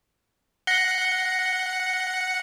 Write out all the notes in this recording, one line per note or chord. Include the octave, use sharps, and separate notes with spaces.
F#5 A#6 C7 C#7 G7